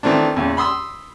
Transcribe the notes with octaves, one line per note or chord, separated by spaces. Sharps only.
D#3 E3 A3 C4 D4
E2 A#2 C#3
B5 C6 D#6 E6